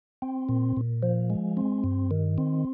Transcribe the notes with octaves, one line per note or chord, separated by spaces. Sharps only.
C4
A#2
A#2
F3
G#3
C4
G2
D#3
C4